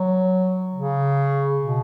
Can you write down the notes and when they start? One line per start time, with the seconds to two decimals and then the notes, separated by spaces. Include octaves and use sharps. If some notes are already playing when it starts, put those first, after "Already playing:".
Already playing: F#3
0.75 C#3
1.60 B2